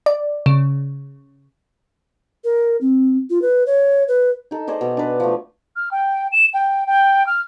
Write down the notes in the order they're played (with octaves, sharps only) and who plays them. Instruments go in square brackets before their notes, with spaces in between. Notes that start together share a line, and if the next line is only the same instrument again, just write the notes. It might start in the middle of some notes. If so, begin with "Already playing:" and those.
[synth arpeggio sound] D5
C#3
[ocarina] A#4
C4
F4
B4
C#5
B4
[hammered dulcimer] D#4 A4
G#4 C5 D5 D#5
B2
D4 B4
F3 A3
[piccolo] F6
G5
E7
G5
G5
F6